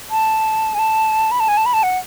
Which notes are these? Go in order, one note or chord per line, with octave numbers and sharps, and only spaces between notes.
A5
G#5
A5
B5
A5
G#5
A5
B5
A5
F#5